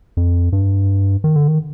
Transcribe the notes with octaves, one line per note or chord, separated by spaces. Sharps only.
F2
G2
D#3
D3
D#3